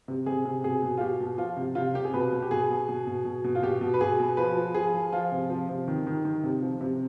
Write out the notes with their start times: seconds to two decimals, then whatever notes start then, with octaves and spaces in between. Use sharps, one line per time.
0.08 C3
0.26 C3 G#4
0.45 C3
0.64 B2 G#4
0.82 B2
0.98 F4
1.01 B2 G4
1.20 B2
1.38 F3 F4
1.57 C3
1.75 C3 F4
1.94 C3 G4
2.05 G#4
2.14 B2 B4
2.33 B2
2.42 G4
2.51 B2 G#4
2.70 B2
2.89 B2
3.07 B2
3.25 B2
3.44 B2
3.55 F4
3.63 B2 G4
3.81 B2
3.94 B4
4.01 B2 G#4
4.20 B2
4.37 F3 B4
4.56 F3
4.74 F3 G#4
4.94 F3
5.13 F3 F4
5.32 C3
5.50 F3
5.69 C3
5.88 D#3
6.07 D#3
6.25 D#3
6.44 C3
6.62 F3
6.81 C3